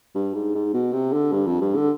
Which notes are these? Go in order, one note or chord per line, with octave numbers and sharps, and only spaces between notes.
G2
G#2
G#2
B2
C3
D3
G2
F2
G2
D3